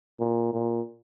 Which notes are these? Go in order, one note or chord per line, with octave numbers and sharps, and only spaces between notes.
A#2
A#2